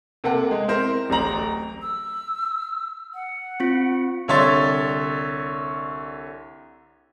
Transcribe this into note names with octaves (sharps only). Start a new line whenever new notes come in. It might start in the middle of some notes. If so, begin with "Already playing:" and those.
C3 A#3 A4 F#5
G#3
C4 E4 A#4 C5
D1 A1 C5 A#5 F#7
E6
F#5
C4 F4
C2 D3 C#5 E5 C6 A6